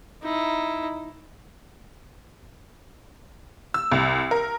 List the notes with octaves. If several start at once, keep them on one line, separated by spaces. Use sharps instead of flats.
D#4 E4
E6
C2
A#4